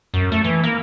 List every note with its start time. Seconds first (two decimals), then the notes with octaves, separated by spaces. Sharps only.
0.14 F#2
0.32 A3
0.44 E3
0.64 A#3